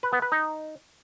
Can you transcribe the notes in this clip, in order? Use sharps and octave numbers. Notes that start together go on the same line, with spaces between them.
B4
B3
B4
D#4